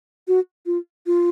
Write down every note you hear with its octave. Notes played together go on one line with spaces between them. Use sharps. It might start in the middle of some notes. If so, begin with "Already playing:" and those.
F#4
F4
F4